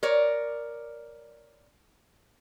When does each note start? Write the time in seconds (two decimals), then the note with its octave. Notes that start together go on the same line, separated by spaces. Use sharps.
0.03 A#4 C#5 D5